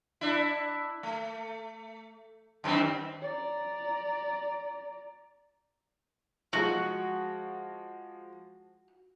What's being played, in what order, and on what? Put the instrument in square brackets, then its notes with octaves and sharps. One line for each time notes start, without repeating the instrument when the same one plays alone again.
[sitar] D4 E4
A3
F#2 D#3 C4
[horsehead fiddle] D5 A#5
[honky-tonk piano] F3 G#3 [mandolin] F#4